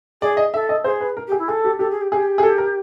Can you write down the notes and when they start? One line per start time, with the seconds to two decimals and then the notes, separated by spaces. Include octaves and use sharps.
0.21 G#4 D5
0.37 D#5
0.54 A4 E5
0.69 D#5
0.84 G#4 C5
1.01 B4
1.17 A#4
1.27 G4
1.32 G#4
1.38 E4
1.48 G#4 A4
1.65 G4
1.79 G4 A4
1.90 G#4
2.01 G4
2.12 G4 G#4
2.38 G#4
2.43 A4
2.58 A#4